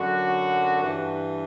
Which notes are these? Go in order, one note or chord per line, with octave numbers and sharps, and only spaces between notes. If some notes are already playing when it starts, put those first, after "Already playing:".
Already playing: F#2 D3 F#3 F#4
G2 E3